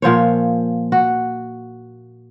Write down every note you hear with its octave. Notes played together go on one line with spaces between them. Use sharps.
A#2 F3 C5 C#5
F#4